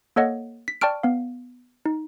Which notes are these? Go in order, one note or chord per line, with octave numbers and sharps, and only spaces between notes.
A#3 A4 C#5 D#5 F#5
B6
D5 G5 A5 C#6 F6 D7
B3 F5
D#4